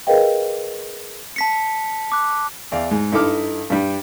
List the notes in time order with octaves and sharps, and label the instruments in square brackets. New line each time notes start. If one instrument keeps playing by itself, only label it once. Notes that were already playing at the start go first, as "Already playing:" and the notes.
[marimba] G#4 A#4 B4 D#5 F5 G5
[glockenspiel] A5 B6 C#7
D6 F#6
[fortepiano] E2 D5 F5
G#2
G2 D#4 E4 A4 D6 F6
G2 G3